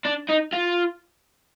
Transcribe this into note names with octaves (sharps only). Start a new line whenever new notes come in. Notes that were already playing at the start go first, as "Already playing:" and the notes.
D4
D#4
F4